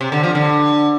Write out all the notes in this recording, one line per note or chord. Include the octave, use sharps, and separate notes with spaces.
C3
D3
F3
D3